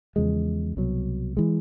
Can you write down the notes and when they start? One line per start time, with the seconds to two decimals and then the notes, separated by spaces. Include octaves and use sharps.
0.16 E2 C#3 F3 G#3
0.77 C2 B2 F#3
1.37 E3 G#3